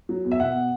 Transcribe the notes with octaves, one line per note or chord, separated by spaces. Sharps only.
F#3
E2
E5
B2 F#5